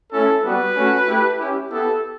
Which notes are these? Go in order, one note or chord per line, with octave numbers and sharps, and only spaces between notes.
A3 C#4 E4 A4
G3 B3 F#4 B4
A3 C#4 F#4
A3 E4 G4
C#4 E4 G4
B3 E4 G4 A4